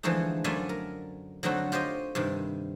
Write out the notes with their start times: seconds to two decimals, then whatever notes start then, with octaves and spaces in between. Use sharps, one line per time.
0.03 D3 E3 F3 G#3 A3 D#4
0.44 F#2 A3 F4 D5 E5 G#5
0.69 A#4
1.43 D3 F#3 A3 C4 D#4 F#4
1.72 F4 G4 C5 C#5 D#5
2.15 G2 C3 D#3